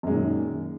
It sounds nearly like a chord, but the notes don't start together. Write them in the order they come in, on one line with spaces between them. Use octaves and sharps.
F#2 G#3 A#2 D#3